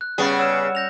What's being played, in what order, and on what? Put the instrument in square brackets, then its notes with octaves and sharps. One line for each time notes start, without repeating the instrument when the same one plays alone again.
[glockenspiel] F#6
[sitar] C#3 B3 G#4 [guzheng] G3 C#4
[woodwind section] C#5 F#5 [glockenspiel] E6 F6 E7
[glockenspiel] G6 A#6 F7